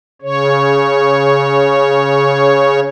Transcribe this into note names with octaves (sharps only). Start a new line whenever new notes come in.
C#3 C#5